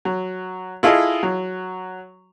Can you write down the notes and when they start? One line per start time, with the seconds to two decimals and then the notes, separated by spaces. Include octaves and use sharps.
0.05 F#3
0.83 E4 F4 G#4 A4 D#5
1.23 F#3